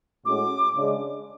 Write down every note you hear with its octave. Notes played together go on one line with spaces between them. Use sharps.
A2 G#3 C#4 F#4 D6
C#3 G#3 D4